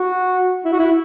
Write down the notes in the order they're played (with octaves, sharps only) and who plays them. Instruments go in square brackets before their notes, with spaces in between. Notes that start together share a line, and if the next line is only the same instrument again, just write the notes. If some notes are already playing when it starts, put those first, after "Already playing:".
Already playing: [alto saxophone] F#4
E4
F#4
E4